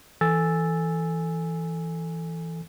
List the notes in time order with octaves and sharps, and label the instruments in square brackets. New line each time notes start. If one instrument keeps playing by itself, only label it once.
[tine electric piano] E3 A4 G#5 E6 A6